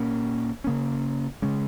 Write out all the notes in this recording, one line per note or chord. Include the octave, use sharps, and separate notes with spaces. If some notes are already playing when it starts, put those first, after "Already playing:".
Already playing: A#2 A#3 C#4
C#3 A#3 C#4
C#3 G#3 C#4